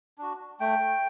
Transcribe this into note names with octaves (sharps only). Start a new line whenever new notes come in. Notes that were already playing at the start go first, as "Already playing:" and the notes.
D4 F#4
A3 G5